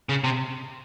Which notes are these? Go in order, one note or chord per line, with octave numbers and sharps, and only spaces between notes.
C#3
C3